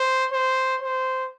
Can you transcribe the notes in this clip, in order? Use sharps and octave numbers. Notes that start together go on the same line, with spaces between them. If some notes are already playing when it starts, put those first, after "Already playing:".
Already playing: C5
C5
C5